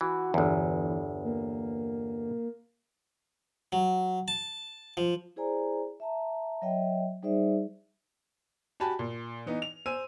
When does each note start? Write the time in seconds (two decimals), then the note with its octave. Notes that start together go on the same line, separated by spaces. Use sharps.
0.01 E3 F#4
0.34 G1 E2 E3
1.24 A#3
3.72 F#3
4.28 A5
4.97 F3
5.36 E4 G#4 C5 D5 G#5 A#5
6.00 E5 A5 A#5
6.62 F#3 C#5 D#5 E5 G5
7.23 G3 D#4 G#4 C5 D5 E5
8.80 F#4 G4 G#5 A5 B5
8.99 A#2
9.46 E3 B3 D#4
9.62 F7
9.86 C5 G#5 E6 D#7